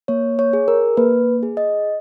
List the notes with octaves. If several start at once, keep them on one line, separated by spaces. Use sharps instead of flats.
A#3 C#5
C#5
G#4
A#4
A#3 B4
G#4
D#5